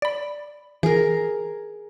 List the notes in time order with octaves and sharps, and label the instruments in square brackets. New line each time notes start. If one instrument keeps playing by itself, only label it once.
[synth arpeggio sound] D5 B5
[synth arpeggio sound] E3 [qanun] G#4 A#4